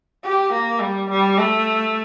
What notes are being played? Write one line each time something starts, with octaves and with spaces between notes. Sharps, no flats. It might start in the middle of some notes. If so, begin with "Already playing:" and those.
G4
A#3
G3
G3
A3